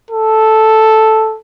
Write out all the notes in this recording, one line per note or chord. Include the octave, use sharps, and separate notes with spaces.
A4